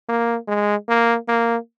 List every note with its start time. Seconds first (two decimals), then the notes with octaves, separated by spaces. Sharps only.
0.09 A#3
0.48 G#3
0.89 A#3
1.29 A#3